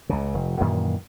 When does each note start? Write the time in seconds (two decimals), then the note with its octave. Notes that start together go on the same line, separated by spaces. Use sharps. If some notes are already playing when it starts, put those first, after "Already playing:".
0.09 C#2 C#3
0.34 F1
0.60 F#2 A#2 D#3 E3